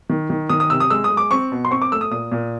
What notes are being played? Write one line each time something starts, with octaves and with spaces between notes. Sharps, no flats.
D#3
D#3
D#3 D#6
D#6
C3 E6
D#6
G#3 E6
D#6
G#3
D6
C4 C#6
B2
C6
C4 C#6
D6
A3 E6
D#6
A#2 D#6
A#2